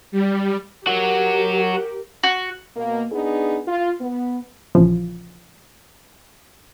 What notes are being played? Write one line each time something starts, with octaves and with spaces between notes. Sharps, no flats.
G3
F#3 F#4 G4 A#4
F#4
B2 A#3
B3 D4 D#4 G#4
F4
B3
A#1 C#3 E3 F3